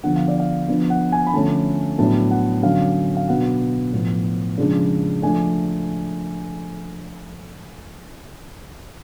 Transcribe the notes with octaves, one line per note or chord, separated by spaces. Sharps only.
D3 F3 B3 D4 F#5
F5
D5
F5
F3 B3 D4
F#5
G#5
B5
D3 F3 A3 C#4 A5
A2 F#3 B3 D4 A5
F#5
D3 F#3 C#4 F5
F5
B2 F#3 B3 D4 F#5
A2 F3 B3
C#3 F3 G#3 D4
F3 A3 D4 G#5